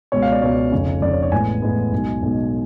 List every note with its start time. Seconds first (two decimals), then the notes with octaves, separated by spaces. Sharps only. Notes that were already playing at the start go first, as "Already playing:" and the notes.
0.12 C#2 B2 G#3 C#5
0.22 F5
0.32 D5
0.42 C#2 B2 G#3 C#5
0.72 F1 F2 C#3
1.02 F1 F2 C#3 D5
1.12 C#5
1.22 C#5
1.32 A1 A2 G#3 B3 G#5
1.62 A1 A2 G#3 B3
1.92 B1 B2 G#3
2.22 B1 B2 G#3